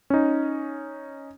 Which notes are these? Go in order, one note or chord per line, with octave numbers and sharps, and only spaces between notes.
C#4 D#4